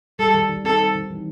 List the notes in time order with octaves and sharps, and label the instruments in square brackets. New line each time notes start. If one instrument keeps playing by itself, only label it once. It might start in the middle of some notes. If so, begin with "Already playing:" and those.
[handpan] G3 [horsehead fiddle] A4
[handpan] D#3
D#3
[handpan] C4 [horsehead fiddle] A4
[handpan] G3
D#3
E3